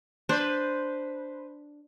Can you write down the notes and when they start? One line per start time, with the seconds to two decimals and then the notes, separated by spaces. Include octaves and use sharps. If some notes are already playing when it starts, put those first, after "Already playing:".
0.29 D4 B4 C5